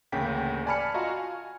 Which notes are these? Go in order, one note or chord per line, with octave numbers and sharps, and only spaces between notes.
A1 D2 C#3 A#3 G5 B6
D5 G#5 A5 B5 F6 C#7
F4 F#4 D#5 F5 A#5
G#5